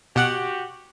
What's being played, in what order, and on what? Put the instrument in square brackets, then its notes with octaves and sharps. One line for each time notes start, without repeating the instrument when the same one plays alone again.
[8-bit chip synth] B2 F#5 F#6 [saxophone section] F#4 G4